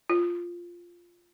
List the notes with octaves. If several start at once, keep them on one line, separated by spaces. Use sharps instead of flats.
F4